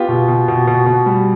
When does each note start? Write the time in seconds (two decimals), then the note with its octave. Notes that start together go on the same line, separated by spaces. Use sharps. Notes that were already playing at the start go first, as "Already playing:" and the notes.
Already playing: B3 F4 G4
0.08 B2
0.28 B2
0.48 B2
0.67 B2
0.86 B2
1.06 G3